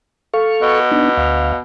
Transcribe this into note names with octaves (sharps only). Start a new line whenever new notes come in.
A4 F5 C#6
B2
B3 D4 D#4
D2 F5